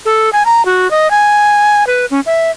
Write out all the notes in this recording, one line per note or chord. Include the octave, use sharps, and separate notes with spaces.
A4
G#5
A#5
F#4
D#5
G#5
B4
C#4
E5